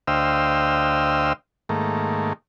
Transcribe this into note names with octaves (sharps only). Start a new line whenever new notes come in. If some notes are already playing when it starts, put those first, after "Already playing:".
D2 C5 D#5 F5 G5 E6
G#2 D#3 A3 A#3